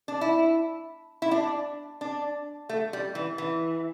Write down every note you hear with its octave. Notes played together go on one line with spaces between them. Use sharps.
D4
E4
E4
D4
D4
A3
G3
E3
E3